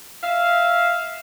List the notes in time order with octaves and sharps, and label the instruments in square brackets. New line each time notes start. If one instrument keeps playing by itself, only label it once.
[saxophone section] E5 F5